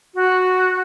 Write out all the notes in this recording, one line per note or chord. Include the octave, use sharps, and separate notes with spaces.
F#4